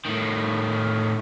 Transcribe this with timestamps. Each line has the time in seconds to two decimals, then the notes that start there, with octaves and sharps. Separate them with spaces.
0.06 A2 D#3